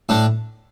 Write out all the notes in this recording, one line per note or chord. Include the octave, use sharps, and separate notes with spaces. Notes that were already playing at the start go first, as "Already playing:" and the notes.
A2 D4